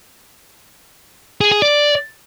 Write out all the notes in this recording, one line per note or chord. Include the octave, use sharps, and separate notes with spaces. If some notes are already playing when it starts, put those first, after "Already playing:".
G#4
G#4
D5